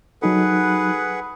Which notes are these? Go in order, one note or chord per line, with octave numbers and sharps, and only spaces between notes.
F#3 D#4 G#4 A4 B4 F#5